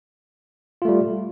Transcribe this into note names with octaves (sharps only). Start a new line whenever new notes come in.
G3 A3 F4